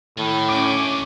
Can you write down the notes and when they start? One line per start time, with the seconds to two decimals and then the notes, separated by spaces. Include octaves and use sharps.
0.18 A2 D#3
0.49 D2 D#3 C#4 D6